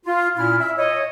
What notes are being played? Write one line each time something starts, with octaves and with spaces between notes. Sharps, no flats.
F4
A#2 C#4 E4 F6
E5
C#5 D#5